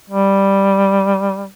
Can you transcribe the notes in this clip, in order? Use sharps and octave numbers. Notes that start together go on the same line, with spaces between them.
G3